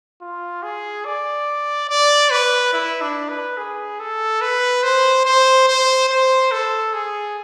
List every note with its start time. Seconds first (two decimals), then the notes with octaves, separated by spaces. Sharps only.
0.21 F4
0.63 G#4
1.05 D5
1.89 D5
2.31 B4
2.73 E4
3.01 D4
3.29 B4
3.57 G#4
4.00 A4
4.41 B4
4.83 C5
5.25 C5
5.68 C5
6.09 C5
6.52 A4
6.94 G#4